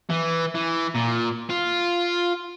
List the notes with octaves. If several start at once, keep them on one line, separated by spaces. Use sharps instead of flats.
E3
E3
A#2
F4